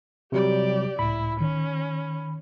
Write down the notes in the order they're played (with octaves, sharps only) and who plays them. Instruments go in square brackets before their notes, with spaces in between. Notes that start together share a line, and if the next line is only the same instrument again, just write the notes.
[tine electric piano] C3 F#3 G3 [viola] G4 D5
[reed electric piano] C#2 A2 [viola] E4 [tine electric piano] B5
[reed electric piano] D#3 [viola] C#4